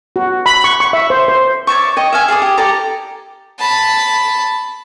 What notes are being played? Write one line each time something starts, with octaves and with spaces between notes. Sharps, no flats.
F#4
B5
C#6
C#6
E5
C5
C5
C#5 D5 E5 C#6
C#5 D#5 G5 D#6
E5 F5 G#5
G#4 A4 D5 D#6
G4
G4 A4 D5 A#5
A5 B5